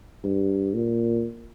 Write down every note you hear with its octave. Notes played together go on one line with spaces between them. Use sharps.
G2
A#2